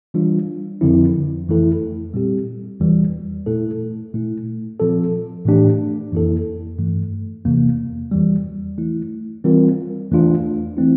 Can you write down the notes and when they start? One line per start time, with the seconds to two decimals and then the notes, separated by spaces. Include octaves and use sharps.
0.14 E3 G3 D4 F4
0.81 F2 D3 F3 C4 E4
1.48 F2 E3 A3 E4 A4
2.14 A#2 G3 C4 G4
2.80 E2 E3 G3
3.46 A#2 A3 E4 A4
4.13 A#2 A3 E4
4.79 A#2 F3 C4 F4 A4
5.45 A2 E3 A3 D4 G4
6.12 F2 E3 A#3 E4 A4
6.78 G2 E3 A3
7.45 E2 C3 E3 A#3
8.11 E2 E3 G3
8.77 E3 A3 E4
9.44 E3 G3 C4 F4 A#4
10.11 E2 E3 A3 D4 F4
10.77 E3 A3 C4 E4